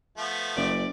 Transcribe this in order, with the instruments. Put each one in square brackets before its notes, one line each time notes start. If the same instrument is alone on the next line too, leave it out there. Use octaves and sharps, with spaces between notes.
[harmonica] F3 A3 B3
[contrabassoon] F#1 [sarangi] D5